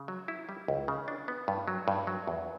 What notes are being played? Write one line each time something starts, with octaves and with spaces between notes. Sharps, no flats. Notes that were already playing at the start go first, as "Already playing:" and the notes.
Already playing: C#3
F#3
E4
G3
C#2
C#3
D4
B3
G2
F#3
G2
F#3
E2